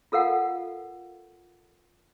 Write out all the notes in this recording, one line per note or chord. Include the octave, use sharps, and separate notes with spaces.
F4 A4 A#4 F5 F#5